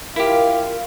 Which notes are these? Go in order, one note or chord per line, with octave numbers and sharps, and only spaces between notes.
E4 F4 G4 A#4 F5